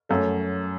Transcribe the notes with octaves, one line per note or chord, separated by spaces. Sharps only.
F#2 F#3 A3